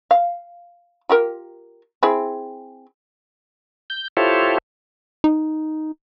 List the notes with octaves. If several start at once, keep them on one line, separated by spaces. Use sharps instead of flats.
F5
F4 G4 A#4
C4 E4 G#4
G6
E4 F4 G4 A4 C5 C#5
D#4